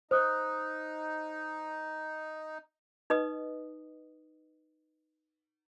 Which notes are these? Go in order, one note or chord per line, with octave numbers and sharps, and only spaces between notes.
D#4 C5 D#6 F#6
D#4 B4 D#5 D#6